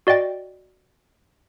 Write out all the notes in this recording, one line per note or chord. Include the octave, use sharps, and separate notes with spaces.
F#4 D5 D#5 G5 A6